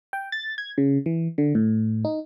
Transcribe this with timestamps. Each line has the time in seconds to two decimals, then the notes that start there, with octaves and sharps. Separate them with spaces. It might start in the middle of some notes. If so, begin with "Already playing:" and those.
0.13 G5
0.32 A6
0.58 G#6
0.78 C#3
1.06 E3
1.38 D3
1.55 A2
2.05 D#4